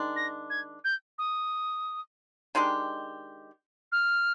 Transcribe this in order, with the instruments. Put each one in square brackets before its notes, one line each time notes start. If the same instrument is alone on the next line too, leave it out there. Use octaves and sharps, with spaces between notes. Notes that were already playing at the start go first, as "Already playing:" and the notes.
Already playing: [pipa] D#3 G#3 D4
[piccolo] A#6
G#6
G6
D#6
[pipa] D#3 G#3 D4 G4
[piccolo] F6